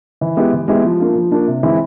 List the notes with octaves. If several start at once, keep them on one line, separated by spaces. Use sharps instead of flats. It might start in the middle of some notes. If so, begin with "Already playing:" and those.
E3
G#3 B3 E4 G4
E3
G#3 B3 E4 G4
F3
A#3 D4 F4
F3
A#3 D4 F4
C3
E3 G#3 C4 E4